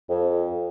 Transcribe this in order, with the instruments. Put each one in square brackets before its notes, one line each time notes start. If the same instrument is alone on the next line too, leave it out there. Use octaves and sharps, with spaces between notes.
[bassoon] F2